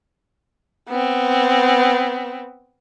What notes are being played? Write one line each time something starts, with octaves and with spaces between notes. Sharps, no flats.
B3 C4